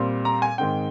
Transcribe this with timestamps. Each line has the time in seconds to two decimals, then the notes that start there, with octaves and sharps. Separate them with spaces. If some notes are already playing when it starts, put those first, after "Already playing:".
Already playing: A#2 G3 C4
0.25 A#5
0.42 G#5
0.58 G#2 D#3 G#3 C4 G5